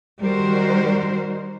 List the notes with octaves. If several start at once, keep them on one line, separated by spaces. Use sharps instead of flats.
D#3 G3 D#4 F#4 A#4 C5